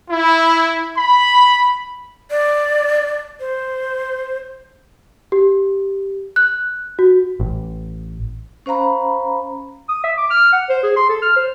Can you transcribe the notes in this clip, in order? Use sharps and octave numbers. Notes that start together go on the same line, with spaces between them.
E4
B5
D5
C5
G4
F#6
F#4
A1
C#4 C5 F5 A#5 B5
D#6
E5
D6
F6
F#5
C5
G#4
C6
A4
F6
C5